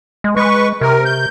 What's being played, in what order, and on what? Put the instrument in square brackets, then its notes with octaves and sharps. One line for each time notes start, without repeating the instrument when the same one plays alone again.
[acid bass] G#3
[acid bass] G#3 [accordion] B4 C#6
[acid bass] C3 [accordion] A#4
[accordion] G6